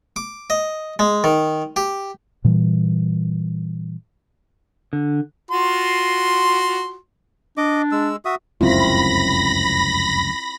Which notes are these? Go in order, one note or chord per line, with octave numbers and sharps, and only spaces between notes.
D6
D#5
G#3
D#3
G4
A#2 E3 G3
D3
F4 F#4 C6
D4 D#5 D6
G#3 E6
F#4 E5 D#6
F1 C#2 F#2 C4 E4 F4 B5 A#6